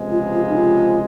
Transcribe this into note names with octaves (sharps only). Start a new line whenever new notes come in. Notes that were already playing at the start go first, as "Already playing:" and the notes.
Already playing: C#2 C3 F3 G#3
F4
F4
D#4
F4